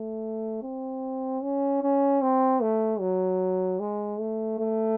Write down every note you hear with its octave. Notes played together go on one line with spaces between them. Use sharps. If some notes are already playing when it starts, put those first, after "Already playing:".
Already playing: A3
C4
C#4
C#4
C4
A3
F#3
G#3
A3
A3